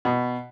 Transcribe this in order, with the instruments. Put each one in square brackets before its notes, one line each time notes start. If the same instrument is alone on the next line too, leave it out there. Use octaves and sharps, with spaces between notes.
[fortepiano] B2